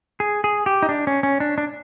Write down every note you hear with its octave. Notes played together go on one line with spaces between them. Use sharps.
G#4
G#4
G4
D#4
D4
C#4
C#4
D4
D4